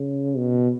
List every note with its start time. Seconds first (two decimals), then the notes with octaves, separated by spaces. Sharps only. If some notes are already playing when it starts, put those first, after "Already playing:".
Already playing: C#3
0.37 B2